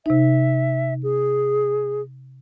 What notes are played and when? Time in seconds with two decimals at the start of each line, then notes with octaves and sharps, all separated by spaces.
0.06 C3 D#4 E5
1.03 G#4